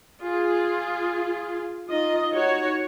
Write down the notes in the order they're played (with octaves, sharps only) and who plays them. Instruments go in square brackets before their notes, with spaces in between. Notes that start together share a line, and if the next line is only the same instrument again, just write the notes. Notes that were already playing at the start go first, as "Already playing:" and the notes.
[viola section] F4 G#4
[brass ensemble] D#4 [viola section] F4 D#5
[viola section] F#4 C#5